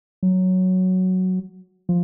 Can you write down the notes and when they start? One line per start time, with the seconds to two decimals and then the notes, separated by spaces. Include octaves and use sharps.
0.23 F#3
1.89 F3